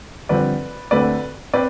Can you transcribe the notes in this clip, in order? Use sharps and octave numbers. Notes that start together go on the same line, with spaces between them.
G2 D3 F3 C4 B4 D5
D2 D3 A3 C4 B4 D5
C4 B4 D5